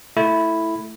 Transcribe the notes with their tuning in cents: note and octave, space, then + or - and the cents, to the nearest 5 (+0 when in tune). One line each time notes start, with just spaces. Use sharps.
A3 +0 E4 +0